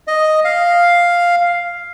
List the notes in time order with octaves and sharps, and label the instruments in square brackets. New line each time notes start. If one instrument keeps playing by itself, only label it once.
[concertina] D#5
F5